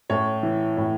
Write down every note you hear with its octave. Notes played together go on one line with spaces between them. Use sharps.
A2 C#4 C#5
E3
A2